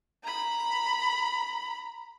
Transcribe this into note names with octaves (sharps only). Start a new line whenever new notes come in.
A#5 B5